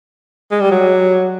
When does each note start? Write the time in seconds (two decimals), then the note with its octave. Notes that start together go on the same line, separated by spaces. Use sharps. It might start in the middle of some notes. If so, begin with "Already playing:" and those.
0.51 G#3
0.61 G3
0.71 F#3